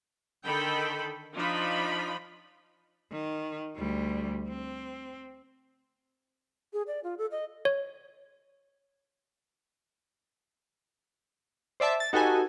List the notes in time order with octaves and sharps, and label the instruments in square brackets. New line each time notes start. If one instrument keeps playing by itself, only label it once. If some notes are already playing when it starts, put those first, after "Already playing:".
[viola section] D3 D#3 A4 G5 B5
F3 D4 D#4 F4 B5
[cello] D#3
D2 G3
C4
[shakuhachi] G#4
D5
F4
A4
D#5
[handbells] C#5
[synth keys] C5 D5 E5 A5
A6
D#4 F#4 G4 A4 B4 G#5